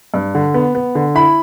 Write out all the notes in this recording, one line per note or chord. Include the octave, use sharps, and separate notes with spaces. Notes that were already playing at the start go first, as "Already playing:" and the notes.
G2
D3
B3
B3
D3
E4 B5